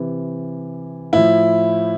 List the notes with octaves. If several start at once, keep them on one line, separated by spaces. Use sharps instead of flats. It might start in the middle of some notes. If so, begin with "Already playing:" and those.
Already playing: C3 E3
A2 F3 E4